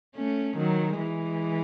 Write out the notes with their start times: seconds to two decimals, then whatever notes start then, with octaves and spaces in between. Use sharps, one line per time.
0.16 A3 C#4
0.57 D#3 F#3
0.97 E3 G#3